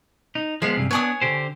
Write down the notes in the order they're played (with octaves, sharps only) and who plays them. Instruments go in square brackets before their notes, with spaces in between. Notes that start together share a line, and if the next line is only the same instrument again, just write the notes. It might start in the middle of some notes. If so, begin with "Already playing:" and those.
[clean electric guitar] D#4
[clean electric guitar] F3 G#3 B3 [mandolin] G#4 F5
[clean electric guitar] G2 C3
[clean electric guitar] B3 D4 [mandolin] C#5 G#5 D#6
[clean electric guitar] D3 G4 C5